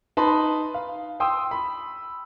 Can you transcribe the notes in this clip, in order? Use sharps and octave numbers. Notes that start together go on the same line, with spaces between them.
D#4 B4 A5 B5 C6
F5
G5 C6 D#6 E6
B5